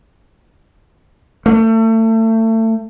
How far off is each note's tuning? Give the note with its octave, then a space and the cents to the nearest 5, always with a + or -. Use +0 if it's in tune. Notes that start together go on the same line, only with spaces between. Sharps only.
A3 +30